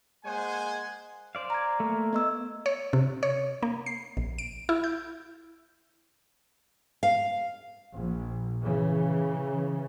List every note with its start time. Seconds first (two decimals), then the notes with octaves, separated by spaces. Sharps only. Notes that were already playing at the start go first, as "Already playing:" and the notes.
0.25 G#3 A#3 C5 F#5 G#5
1.35 C5 D5 F5
1.50 A#5 G#6
1.80 A3 A#3
2.13 B3 D#5 E6
2.66 C#5
2.93 C3
3.23 C#5
3.63 A#3
3.86 C7
4.17 A#1
4.38 D7
4.69 E4
4.84 G6
7.03 F5
7.96 A#1
8.62 C#3 E3